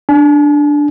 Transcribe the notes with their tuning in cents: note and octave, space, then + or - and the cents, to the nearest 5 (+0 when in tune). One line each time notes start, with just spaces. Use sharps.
D4 +0 G#5 +45